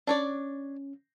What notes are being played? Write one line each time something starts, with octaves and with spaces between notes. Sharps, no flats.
C#4 D4 C#5 D5